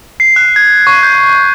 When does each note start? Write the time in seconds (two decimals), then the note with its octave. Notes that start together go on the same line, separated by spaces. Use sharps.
0.20 C7
0.36 F#6
0.56 G#6
0.87 C#6
1.03 G6